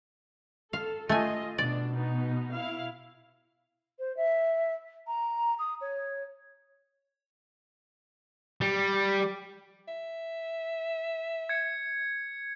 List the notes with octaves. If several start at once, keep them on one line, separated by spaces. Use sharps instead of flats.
A4 F5
A3 F4 D#5 G#5
B2 D4 D5
B3 D#4
E4 F5
C5
E5
A#5
D#6
C#5
G3
E5
G#6 C#7